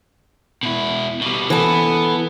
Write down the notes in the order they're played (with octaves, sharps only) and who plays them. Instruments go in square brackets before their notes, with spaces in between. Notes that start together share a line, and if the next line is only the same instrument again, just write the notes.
[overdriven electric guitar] B2 E4
B2 G3
[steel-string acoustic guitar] E3 A4 [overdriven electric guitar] B3